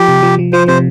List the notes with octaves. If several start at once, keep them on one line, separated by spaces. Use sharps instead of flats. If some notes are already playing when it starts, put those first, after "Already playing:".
Already playing: F3 G4
C3
F3
F3
F3 C5
C3 C5